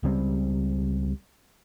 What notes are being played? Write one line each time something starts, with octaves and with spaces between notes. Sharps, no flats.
C#2 C#3 G3 C4